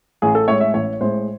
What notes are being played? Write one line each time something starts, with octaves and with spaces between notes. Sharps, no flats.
A1 G#4
A4
A2 G#3 C#5
E5
A1 C#5
A2 G#3 C5